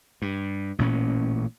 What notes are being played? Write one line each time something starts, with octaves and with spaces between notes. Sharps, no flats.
G2
A1 A#2 C4 C#4